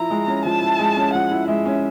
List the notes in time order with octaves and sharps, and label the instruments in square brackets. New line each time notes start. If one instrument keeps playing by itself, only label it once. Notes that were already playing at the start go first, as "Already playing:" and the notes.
Already playing: [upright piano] F3 E4 [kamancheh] A#5
[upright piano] G#3
C#4
[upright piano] F3 [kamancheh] A5
[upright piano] E4
G#3
C#4
[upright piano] F3 [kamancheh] F#5
[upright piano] E4
[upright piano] G#3 [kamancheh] E5
[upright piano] C#4